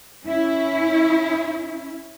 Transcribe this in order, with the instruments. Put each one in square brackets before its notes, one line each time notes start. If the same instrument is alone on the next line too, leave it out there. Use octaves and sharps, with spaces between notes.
[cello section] C#4 E4